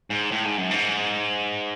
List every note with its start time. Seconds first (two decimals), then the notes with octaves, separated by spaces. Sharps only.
0.10 G#2
0.31 A2
0.45 G#2
0.58 F#2
0.71 G#2